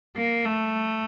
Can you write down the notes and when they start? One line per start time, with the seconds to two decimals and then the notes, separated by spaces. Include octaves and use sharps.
0.17 A#3
0.46 A3